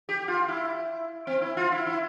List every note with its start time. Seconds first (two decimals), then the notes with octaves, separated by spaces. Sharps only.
0.09 G4
0.28 F4
0.48 E4
1.27 C4
1.42 E4
1.57 F4
1.72 E4
1.87 E4